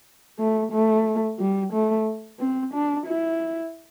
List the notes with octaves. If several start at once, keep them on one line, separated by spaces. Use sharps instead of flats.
A3
A3
G3
A3
C4
D4
E4